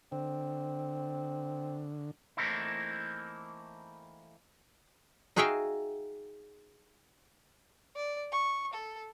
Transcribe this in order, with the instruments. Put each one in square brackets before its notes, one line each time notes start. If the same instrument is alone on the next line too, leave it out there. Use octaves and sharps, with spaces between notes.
[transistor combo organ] D3 [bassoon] C4
[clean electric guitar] E3 A3 A#3 C4 D#4 E4
[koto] D#4 F#4 G#4 E5 F5 G5
[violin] D5
C#6
A4